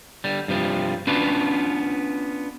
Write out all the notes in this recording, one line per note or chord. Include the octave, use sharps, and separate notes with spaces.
D3 G3
G2 C3 F3 G3
B3 C#4 D4 F4 F#4 B4